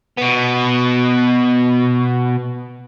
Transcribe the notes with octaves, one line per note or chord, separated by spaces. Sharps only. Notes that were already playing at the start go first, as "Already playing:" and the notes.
B2 B3